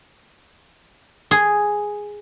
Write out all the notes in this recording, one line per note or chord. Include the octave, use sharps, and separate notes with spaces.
G#4